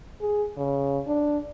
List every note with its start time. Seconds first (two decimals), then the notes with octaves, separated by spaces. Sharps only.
0.21 G#4
0.57 C#3
1.07 D4